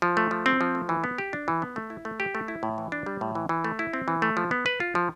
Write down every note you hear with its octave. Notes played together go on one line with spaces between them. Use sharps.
F3
A3
F3
C4
F3
A3
E3
B3
G4
D4
E3
B3
A3
E4
A3
G4
A3
E4
A2
E3
D4
G3
A2
E3
E3
A3
E4
C4
E3
A3
F3
B3
B4
F4
F3